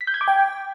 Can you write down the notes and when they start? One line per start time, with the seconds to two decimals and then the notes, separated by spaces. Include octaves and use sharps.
0.01 B6
0.07 G6
0.14 G#6
0.21 D6
0.28 G5